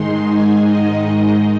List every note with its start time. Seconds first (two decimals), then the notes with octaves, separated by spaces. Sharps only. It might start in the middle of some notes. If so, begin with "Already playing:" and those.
Already playing: G#2 D#3 G#3 D#4 C6
0.32 G#5
0.60 D#5